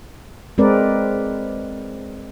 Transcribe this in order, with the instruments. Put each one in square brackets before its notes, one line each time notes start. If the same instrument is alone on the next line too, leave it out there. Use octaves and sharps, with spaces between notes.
[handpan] G#3 C4 A#4 B4 D5